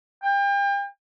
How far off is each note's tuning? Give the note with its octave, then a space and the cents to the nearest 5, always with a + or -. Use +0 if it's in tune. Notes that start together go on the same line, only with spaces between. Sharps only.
G5 +35